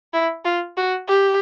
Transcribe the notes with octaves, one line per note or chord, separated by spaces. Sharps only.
E4
F4
F#4
G4